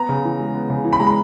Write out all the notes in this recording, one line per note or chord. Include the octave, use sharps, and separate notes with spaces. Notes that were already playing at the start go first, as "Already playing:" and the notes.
Already playing: B3 A#5
C#3
E3
G#3
B3
C#3
E3
B5
G#3 A#5
B5